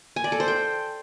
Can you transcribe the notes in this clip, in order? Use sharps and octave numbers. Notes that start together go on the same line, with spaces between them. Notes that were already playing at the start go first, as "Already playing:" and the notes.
G#5
D5
A4
C5
G5